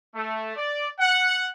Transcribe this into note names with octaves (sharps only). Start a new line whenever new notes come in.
A3
D5
F#5